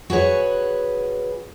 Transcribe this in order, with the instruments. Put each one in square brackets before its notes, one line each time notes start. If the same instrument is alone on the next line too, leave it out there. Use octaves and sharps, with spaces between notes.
[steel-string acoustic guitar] F#4 G#4 B4 C#5